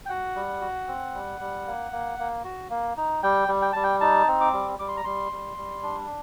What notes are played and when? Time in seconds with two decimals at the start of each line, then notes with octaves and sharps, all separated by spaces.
0.06 G5
0.09 F#4 F#5
0.36 G3
0.61 F#4
0.88 C4
1.14 G3
1.40 G3
1.67 A#3
1.92 A#3
2.19 A#3
2.44 F#4
2.70 A#3
2.97 D#4
3.23 G3 G5
3.48 G3
3.62 G5
3.73 G3 A5
3.84 G5
4.01 D#4 A5
4.28 C4
4.41 D6
4.54 G3
4.79 G3 D6
4.88 C6
4.97 A#5
5.04 G3 C6
5.32 G3
5.57 G3
5.83 D4